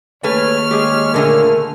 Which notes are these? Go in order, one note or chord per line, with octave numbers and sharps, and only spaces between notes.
D#2 A3 G#4 B4 C#5 F6
G#3 G4 G#4
A#2 D3 A3 A#4 G#5